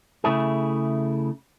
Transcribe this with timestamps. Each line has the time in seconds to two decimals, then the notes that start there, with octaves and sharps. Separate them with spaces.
0.24 C#3 A3 E4 G#4